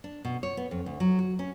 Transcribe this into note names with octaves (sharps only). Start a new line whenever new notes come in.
D4
B2
C#5
B3
F2
D2
F#3
F#4
C#4